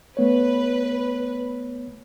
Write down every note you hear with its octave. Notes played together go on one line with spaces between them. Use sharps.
A3 B3 B4 C#5